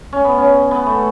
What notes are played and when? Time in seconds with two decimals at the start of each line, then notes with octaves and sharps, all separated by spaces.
0.13 C#4
0.24 B3
0.38 C#4
0.71 B3
0.86 A3